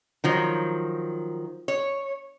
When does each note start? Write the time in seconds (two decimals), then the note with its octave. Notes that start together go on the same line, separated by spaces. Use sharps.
0.24 D#3 F3 F#3
1.68 C#5